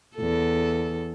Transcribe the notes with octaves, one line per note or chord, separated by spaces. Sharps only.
E2 A4